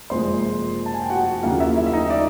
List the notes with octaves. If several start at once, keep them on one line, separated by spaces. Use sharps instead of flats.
F#1 F2 C3 F3 G#3 C5 C6
A5
G#5
G5
F#4 F#5
D#2 C#3 F#3 A#3 F4 F5
E4 E5
E4 E5
E5
D#4 D#5
D5